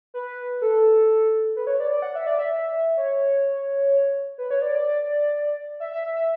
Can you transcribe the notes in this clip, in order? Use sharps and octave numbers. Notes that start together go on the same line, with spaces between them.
B4
A4
B4
C#5
D5
D5
F#5
E5
D5
E5
C#5
B4
C#5
D5
D5
E5
E5
E5
E5